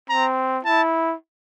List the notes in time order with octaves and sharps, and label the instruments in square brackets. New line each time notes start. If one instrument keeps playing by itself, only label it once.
[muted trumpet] C4 [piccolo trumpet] A#5
[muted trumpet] E4 [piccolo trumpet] A5